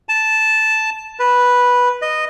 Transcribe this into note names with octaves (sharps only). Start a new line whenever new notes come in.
A5
B4
D#5